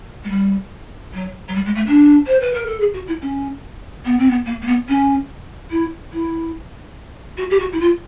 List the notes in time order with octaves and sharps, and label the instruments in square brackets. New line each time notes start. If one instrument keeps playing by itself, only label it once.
[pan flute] G#3
G3
F#3
F#3
G3
G#3
A3
D4
C5
B4
A#4
A4
G#4
F#4
E4
C#4
B3
C4
B3
A#3
A#3
B3
C#4
E4
E4
F#4
G4
F#4
E4
F4